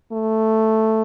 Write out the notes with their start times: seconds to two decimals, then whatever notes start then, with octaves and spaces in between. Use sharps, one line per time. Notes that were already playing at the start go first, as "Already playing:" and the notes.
0.12 A3